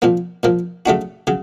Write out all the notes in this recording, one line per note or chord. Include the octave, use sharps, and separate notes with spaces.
A#2 F3 A#3
A#2 F3 A#3
C#3 F#3 A3 D4 F#4
C#3 F#3